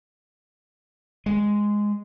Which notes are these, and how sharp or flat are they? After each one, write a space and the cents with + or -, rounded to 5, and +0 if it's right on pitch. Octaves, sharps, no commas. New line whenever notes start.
G#3 -5